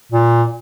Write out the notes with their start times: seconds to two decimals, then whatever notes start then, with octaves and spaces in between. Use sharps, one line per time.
0.12 A#2